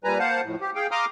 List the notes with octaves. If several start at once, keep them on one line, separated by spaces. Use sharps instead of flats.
A#2 G3 B4 G#5 A#5
A#3 C5 F5 F#5 A5
F2 A2
G4
G#4 F5 G5
F5 A#5 C6 D6 D#6 F6